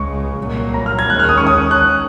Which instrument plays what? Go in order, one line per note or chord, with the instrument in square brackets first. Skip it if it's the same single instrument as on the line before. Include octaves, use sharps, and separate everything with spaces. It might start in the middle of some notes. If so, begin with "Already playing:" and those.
Already playing: [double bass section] C#2 C#3 G#3 [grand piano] C#6
[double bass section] C2 A#2 F#3 A#3
[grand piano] A#5
F6
G#6
[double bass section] D#2 D#3 G#3 C#4 [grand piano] F#6
[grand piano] F6
D#6
C#6
D#6
F#6